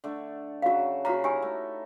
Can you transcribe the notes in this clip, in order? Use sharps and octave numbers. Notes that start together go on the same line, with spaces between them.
D3 A3
C#3 F#3 F#4 F5
C#3 A#3 F#4 A#5
D#4 E4 G4 A#4 G#5
A3